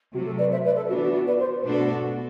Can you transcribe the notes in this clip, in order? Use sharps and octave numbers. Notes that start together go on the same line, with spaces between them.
C3 F#3 A3 F#4
A4
B4 D5
C5 E5
B4 D5
A4
E3 B3 D4 F#4
F#4
F#4
B4 D5
C5
B2 A3 D4 F#4 A4